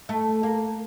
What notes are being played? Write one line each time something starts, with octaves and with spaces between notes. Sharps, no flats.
A3
A#3